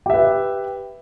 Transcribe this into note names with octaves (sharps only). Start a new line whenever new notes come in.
G4 B4 E5